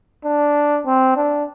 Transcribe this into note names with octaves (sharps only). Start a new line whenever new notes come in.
D4
C4
D4